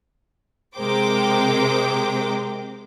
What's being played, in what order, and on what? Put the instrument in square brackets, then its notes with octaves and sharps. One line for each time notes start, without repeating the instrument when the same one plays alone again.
[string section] C3 G#3 A#4 C5 G5 D6